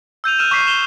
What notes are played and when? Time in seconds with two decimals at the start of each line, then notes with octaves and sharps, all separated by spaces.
0.24 E6 G6 D#7 F7
0.39 E6 F6 D#7 E7
0.51 C#6 D6 F6 B6 C7 D#7
0.67 E7 F7 G7